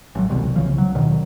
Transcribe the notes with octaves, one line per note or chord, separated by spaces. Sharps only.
A1 F#3
D#1 C2 B2
C2 C#3 E3 F3
F#3
D#1 B2 D#3